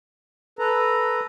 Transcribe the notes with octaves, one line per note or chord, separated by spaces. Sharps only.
A4 B4 A#5